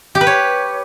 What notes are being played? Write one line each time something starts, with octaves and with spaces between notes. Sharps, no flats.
G4
B4
C#5